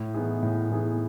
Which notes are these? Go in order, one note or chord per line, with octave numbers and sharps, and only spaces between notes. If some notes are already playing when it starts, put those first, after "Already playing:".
Already playing: A2
E3 B3 D#4 G#4
A2
E3 B3 D#4 G#4